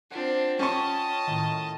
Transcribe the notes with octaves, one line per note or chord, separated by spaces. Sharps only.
C4 D4 F4 F#5
C#4 D#5 G5 A5 C6 C#6
A2 D#3